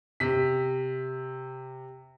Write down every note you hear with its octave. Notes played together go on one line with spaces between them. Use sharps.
C3 B6